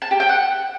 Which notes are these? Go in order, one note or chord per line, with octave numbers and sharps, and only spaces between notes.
A5
G4
G5
F#5